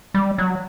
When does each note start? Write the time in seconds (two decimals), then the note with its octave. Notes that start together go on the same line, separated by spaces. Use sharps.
0.14 G3
0.38 F#3